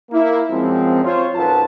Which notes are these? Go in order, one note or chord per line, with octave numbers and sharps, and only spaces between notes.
A#3 E4
F#2 F3 G#3 C4
F4 C5 C#5
B1 F#2 F#3 B4 A5